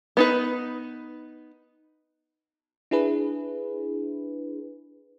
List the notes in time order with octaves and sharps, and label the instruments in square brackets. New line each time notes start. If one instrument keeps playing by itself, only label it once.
[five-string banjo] B3 D#4 B4
[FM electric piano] D4 E4 G#4 B4